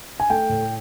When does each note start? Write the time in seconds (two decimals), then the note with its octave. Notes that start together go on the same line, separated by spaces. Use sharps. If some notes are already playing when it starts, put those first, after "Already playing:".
0.20 G#5
0.30 A3 G5
0.49 A2